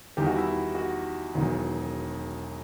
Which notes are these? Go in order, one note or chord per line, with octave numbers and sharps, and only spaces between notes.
E2 D#3 G3 G4
F#4
E4
F#4
E1 E2 D#3 F#3